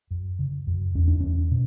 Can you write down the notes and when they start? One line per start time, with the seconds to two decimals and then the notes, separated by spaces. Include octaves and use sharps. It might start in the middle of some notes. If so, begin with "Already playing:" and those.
0.11 F#2
0.39 C#3
0.67 F#2
0.95 E2 C#4
1.08 D4
1.20 E2 C#4
1.51 B2